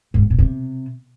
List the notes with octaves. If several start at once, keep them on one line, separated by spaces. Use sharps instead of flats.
G#2
C3
B2
C3